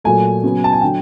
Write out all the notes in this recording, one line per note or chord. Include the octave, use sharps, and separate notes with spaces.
A#2 F#3 A3 G#5
C#3 F#3 B3
A5
G#5
D3 F#3 G5